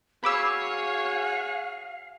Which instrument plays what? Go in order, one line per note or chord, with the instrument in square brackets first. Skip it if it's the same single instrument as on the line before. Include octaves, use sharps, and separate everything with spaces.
[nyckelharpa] F#4 G#4 [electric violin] C#5 [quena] F5 [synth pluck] B5 D6 E6